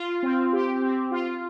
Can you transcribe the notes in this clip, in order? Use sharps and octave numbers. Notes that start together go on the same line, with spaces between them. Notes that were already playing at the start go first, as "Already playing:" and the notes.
Already playing: F4
C4
G4
C4
F4